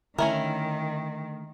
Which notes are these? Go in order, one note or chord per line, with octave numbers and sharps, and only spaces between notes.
D3 D#3 A3 C#4 E4 A#4 E5